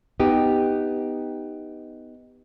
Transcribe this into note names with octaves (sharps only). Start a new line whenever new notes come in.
B3 D#4 G4